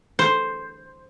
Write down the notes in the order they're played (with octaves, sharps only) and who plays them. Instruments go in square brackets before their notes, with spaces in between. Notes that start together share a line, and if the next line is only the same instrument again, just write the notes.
[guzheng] C5